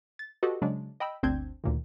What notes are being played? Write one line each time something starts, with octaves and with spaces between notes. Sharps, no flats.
A6
F#4 G4 A4 B4 D#5
C#3 F#3 G#3 D4
D#5 G5 B5 E6
G1 D2 C4 D4 G6 G#6
D2 A#2 D#3